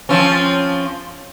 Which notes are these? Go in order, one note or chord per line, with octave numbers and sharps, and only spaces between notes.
F3 C4 C#4